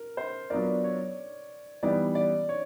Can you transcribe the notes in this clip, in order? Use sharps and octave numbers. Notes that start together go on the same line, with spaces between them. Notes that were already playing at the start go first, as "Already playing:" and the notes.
Already playing: A#4
C5
F#3 B3 D4 F4 A#4 D5
C#5
E3 G3 B3 D#4 D5
D5
C#5